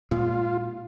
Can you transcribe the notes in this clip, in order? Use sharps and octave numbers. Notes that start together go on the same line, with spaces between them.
A#2 G#3 F4